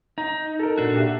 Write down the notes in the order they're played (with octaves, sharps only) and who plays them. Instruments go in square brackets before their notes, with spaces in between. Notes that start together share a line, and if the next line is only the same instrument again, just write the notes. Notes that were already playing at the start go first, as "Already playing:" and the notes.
[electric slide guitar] D#4 [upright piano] A#5
[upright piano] A4 A#4
[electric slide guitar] A#2 D4 F#4
[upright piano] G4 E5